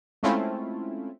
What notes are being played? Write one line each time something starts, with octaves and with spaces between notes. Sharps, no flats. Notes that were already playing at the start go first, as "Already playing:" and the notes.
G#3 A3 C4 C#4 E4 F4